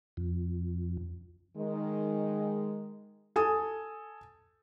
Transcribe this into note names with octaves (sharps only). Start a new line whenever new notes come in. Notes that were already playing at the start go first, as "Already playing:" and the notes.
F2
D#3 G#3
A4 G#5 D#6